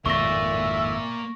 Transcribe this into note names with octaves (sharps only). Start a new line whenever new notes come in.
G#1 F2 A2 A#3 D5 E5 C#6 A#6